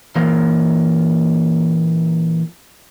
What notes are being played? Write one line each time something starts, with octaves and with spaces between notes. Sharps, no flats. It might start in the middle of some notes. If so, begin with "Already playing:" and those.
A#2 E3 A#3 A#4 F5